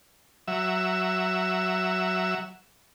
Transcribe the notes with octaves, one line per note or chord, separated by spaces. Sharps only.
F#3 E5